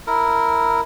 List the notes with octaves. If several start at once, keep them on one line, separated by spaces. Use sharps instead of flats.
E4 A#4